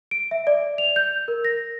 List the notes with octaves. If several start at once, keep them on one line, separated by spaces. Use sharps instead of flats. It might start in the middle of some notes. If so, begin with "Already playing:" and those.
D7
E5
D5
F7
G6
A#4
A#6